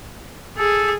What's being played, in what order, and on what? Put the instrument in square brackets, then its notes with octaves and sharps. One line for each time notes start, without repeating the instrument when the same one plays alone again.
[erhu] G#4 [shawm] A4